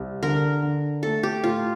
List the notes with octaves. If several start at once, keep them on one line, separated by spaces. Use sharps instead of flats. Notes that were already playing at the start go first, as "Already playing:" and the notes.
Already playing: C2
D3 A#4
D3
A3 A4
G4
A2 F4